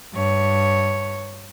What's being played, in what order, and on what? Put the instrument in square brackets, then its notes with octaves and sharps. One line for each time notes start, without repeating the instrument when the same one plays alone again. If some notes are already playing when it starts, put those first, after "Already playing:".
[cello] G2 C#5